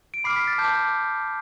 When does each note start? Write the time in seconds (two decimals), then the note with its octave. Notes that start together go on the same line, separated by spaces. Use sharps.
0.14 D7
0.24 B5 D6 F6 C7
0.36 B6
0.47 A6
0.58 A5 D6 G6